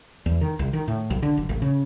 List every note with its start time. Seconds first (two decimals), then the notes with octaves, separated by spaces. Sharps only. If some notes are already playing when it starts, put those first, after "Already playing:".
0.26 E2
0.41 D#3
0.59 C2
0.73 D#3
0.88 A2
1.10 B1
1.23 D3
1.37 F#1
1.49 A1
1.62 C#3